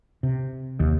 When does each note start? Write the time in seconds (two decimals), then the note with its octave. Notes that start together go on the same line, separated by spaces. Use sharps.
0.23 C3
0.80 D#2